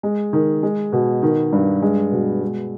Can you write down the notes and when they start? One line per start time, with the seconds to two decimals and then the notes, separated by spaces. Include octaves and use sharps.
0.03 G#3
0.33 D#3
0.63 G#3
0.93 B2
1.22 D#3
1.53 G2
1.82 G#3
2.12 B2
2.42 G#3